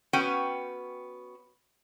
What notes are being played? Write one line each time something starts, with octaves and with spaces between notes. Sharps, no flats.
B3 C#4 F#4 G5